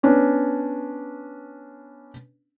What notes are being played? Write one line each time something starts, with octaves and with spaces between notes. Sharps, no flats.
B3 C#4 D4